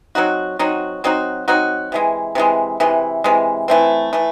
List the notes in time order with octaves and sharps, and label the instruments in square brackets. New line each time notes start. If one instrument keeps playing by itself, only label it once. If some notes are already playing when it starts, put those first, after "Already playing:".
[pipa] F#3 C4 D#4 F#4
F#3 C4 D#4 F#4
F#3 C4 D#4 F#4
F#3 C4 D#4 F#4
C3 E3 G#3
C3 E3 G#3
C3 E3 G#3
C3 E3 G#3
E3 A3 C4
E3 A3